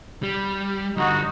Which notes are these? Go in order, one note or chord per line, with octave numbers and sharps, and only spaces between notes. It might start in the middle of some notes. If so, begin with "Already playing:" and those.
G3
D3 G3 D#4 F#4